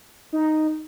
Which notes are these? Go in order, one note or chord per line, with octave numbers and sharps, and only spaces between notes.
D#4